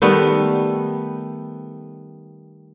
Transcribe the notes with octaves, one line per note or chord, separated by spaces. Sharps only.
D#3 G3 A3 B3